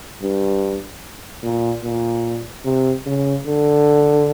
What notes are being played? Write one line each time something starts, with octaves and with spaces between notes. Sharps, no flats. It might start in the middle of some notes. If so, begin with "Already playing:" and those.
G2
A#2
A#2
C3
C#3
D3